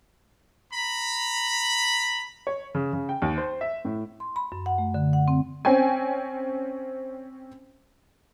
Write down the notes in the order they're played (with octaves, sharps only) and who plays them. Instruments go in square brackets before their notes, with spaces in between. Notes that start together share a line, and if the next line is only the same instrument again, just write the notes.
[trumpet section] A#5 B5
[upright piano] C#5
C#3
C#3
G5
D#2
C5
E5
A2
[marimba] C6
B5
F#2
F#5
A3
D3
F#5
C4
[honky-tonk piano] C4 C#4 G5 G#5